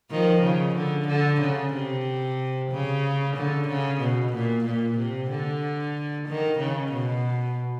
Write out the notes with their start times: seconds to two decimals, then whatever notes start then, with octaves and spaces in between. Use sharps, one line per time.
0.11 D#3 F3
0.43 C#3
0.76 D3
1.08 D3
1.41 C#3
1.74 C3
2.71 C#3
3.36 D3
3.68 C#3
4.01 B2
4.33 A#2
4.65 A#2
4.99 C3
5.30 D3
6.28 D#3
6.60 C#3
6.93 B2